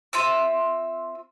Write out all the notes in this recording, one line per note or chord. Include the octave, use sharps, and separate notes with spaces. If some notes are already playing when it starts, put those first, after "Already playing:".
C4 F4 E5 E6